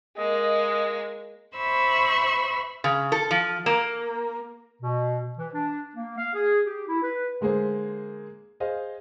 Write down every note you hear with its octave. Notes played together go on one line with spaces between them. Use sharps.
G#3 A#3 D#5
C5 E5 B5 C#6 E6
C#3
A4
F3
A#3
B2
E3
D4
A#3
F5
G#4
G4
E4
B4
D3 G#3 A#3 G#4 C5
G#4 C5 D#5 F5